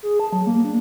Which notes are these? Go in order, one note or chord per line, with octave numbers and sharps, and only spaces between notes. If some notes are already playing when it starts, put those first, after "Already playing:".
G#4
A5
F#3
A#3
D4